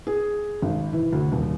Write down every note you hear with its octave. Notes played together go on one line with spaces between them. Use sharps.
G#4
G#1
E3
D2
D#1